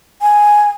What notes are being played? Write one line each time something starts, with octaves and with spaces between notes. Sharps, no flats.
G#5